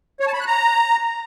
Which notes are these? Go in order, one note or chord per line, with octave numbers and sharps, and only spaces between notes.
C#5
A5
B5
F#6
A#5